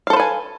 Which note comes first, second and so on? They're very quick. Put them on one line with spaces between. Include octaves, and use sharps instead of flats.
F5 A4 C5 B4 G#5